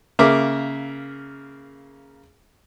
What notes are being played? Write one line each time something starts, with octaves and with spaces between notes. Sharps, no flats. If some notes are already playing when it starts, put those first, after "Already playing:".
C#3 A#3 A#4 E5 D6